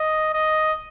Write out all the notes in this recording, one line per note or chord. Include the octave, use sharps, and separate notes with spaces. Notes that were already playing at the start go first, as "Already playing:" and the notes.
Already playing: D#5
D#5